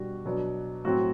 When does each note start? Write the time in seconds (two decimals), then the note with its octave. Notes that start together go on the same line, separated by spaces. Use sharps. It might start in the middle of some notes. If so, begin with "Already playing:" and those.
Already playing: B2 G3 D4 F#4
0.25 B2 F#3 B3 D4
0.85 A2 F#3 C4 F#4